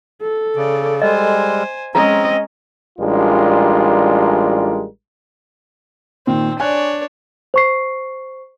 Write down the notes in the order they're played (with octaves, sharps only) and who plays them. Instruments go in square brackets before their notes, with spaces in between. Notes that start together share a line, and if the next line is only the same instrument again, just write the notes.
[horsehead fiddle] A4
[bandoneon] C#3 [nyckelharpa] D5
[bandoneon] G3 G#3 [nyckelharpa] C5 G#5 [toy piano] D#5
[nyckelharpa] G#3 C#4 [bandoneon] C4 [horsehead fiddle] D#5 [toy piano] A#5
[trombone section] A1 G3 G#3 D4 F4 A#4
[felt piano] A#2 D#3 [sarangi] C4
[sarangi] D4 [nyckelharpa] C#5 D5 [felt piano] G#5 F#6
[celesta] C5 C#6 C7